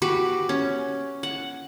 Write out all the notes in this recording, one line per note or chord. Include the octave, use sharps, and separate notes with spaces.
F#4 G4 B4
C#4
F#5